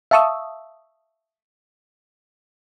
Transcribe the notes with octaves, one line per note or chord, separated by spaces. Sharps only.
E5 F5 A5 C#6 D#6 E6